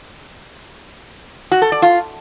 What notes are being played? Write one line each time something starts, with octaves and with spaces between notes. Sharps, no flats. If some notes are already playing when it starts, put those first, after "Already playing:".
F#4
A4
D5
F4